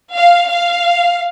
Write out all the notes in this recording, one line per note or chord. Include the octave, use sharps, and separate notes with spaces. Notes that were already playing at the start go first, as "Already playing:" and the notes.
F5
F5